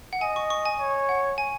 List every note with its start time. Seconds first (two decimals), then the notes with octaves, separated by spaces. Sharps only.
0.13 F#5
0.21 D#5 G#5
0.36 C#6
0.50 C#6
0.65 G#5
0.79 C#5
1.09 F#5
1.38 G#5